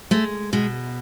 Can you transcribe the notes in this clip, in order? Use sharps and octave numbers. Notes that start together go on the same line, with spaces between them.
G#3 A3
B2 G#3